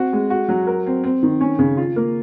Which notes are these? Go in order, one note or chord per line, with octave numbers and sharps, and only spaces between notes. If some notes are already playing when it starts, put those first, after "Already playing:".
Already playing: C4 F#4
G#3
F#4
F#3
A#4
C4
C4
D#3
C#4
C#3
F4
A#3